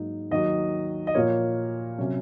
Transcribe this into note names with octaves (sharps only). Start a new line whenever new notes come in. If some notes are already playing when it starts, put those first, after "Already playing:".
Already playing: G#2 F#3 A#3 D#4
D#2 D#3 F#3 D#5
D#5
A#2 F3 A#3 C#5
C3 F#3 C#4